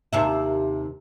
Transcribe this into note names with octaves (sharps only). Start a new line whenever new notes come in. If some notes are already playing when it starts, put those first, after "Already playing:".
D#2 C3 E5